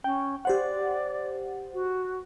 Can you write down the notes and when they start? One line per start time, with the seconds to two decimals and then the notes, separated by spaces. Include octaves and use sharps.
0.04 C#4 G5
0.45 G4 C5 D5 F#5
1.74 F#4